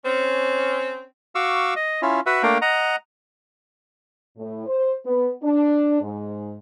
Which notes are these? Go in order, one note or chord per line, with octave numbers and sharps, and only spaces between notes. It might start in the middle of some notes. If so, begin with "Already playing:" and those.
C4 C#4
F#4 F5 C#6 D6 E6
D#5
C#4 E4 F4
F#4 B4 E5 F#5
A3 A#3 D4 A#4 F5 G5
D#5 F#5 A#5
A2
C5
B3
D4
G#2